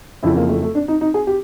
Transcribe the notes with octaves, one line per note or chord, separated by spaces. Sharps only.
F2 C#3 E3 E4
A#3
A3
A3
D4
D#4
D#4
G#4
G4